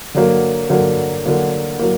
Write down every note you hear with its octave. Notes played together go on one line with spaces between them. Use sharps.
D3 F#3 A#3
D3 F#3 A#3
D3 F#3 A#3
F#3 A#3